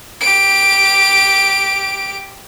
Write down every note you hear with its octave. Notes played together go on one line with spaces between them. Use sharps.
G4 D7